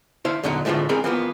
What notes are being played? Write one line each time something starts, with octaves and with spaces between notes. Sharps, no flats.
E4 C5 E5 F5
E2 A#2 D3 F#3 D#4
A2 D3 E3 F3 G#3 A3
C#2 E3 C4 G#4 A#4 B5
E3 F3 A#3 B3